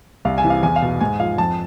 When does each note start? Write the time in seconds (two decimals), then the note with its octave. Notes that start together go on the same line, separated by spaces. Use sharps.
0.25 C2 F5
0.38 G#5
0.44 C3 E3
0.50 F5
0.63 E2 G#5
0.76 F5
0.82 B2
1.01 G#2 G#5
1.19 F3 F5
1.38 F2 A5